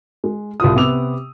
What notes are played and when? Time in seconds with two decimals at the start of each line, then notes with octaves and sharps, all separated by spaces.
0.24 G#3
0.60 C2 F4 D#6
0.75 C3 B3 D6 E6 F7